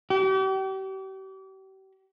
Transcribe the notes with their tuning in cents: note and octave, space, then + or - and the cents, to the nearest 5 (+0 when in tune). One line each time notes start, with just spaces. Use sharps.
G4 -40